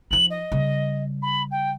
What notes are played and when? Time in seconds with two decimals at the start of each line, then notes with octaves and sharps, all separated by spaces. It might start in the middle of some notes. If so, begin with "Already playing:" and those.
0.11 F3 D#4 F#7
0.30 D#5
0.52 C#3 G3
1.22 B5
1.51 G5